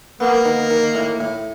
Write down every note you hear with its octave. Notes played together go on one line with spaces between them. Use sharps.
A#3 B3
D#3
D#3
A2
A2